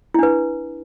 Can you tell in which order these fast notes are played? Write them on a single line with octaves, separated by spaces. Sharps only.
E4 D4 B4